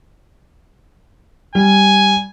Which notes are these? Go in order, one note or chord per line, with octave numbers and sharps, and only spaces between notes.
G3 G#5